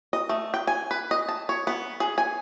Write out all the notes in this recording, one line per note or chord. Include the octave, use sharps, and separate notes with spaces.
D#5
A3
G5
G#5
B4
D#5
A5
C#5
B3
G#4
G#5